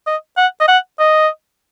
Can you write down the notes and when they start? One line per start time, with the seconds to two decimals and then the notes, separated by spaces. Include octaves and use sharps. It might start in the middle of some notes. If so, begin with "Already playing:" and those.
0.07 D#5
0.37 F#5
0.60 D#5
0.68 F#5
1.00 D#5